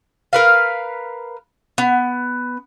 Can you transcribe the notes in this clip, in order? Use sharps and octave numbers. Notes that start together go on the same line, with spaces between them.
A#4 B4 F5
B3